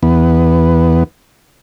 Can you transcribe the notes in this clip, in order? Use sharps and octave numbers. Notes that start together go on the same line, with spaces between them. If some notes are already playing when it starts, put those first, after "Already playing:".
E2 B3